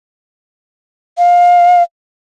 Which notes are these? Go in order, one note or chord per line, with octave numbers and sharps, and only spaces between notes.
F5